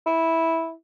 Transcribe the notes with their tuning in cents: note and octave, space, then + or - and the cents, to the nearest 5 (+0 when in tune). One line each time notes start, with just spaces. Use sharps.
E4 -10